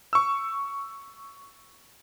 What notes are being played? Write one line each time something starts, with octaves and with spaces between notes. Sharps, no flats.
C#6 E6